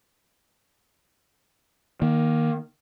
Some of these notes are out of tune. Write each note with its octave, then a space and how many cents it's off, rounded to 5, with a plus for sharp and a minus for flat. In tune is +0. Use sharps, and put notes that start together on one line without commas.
D#3 +0 A#3 +20